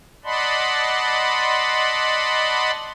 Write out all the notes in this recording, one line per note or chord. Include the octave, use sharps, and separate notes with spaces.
D5 D#5 F#5 A5 B5 C6